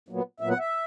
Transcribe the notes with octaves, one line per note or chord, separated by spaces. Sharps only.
A#2 F#3 B3
A#2 F#3 B3 E5
F#5
E5